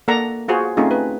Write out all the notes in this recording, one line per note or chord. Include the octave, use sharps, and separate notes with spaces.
A#3 A4 D5 F#5 A#5
F4 F#4 G#4 C5
A3 C4 C#4 D#4 F4 G#4
B4